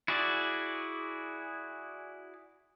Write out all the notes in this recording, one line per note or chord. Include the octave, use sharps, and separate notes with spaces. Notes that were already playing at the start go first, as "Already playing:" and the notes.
E4 F#4 G#4 D5